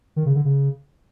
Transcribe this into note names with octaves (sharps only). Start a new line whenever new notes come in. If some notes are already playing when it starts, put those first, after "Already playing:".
D#3
C#3
D3
C#3